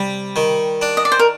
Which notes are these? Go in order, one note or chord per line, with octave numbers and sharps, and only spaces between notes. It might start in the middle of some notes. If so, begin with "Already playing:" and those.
Already playing: C3 G3
D#3
D4
D#5
D5
C5
A#4